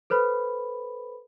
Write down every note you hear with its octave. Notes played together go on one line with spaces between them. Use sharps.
A4 B4 C5 B5